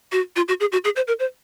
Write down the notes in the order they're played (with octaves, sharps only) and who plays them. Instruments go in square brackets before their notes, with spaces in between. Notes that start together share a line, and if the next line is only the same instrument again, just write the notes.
[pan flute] F#4
F4
F#4
G#4
F#4
G#4
C5
A#4
C5